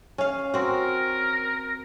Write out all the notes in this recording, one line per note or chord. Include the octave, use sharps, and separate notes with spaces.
C#4 F5
C4 F#4 A#4